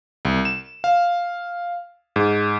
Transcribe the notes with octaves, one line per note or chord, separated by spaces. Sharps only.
C2
E7
F5
G#2